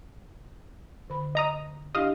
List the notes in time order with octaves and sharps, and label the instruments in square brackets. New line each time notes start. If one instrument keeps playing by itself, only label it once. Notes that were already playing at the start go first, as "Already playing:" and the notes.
[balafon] D3 B5
[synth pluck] D#5 A#5 D#6
[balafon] D4 E4 G4 [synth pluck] D#5 F5